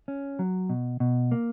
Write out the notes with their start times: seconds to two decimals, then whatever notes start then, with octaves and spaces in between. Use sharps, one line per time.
0.08 C#4
0.39 F#3
0.69 B2
1.00 B2
1.32 A#3